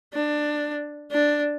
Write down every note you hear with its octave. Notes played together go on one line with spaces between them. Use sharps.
D4
D4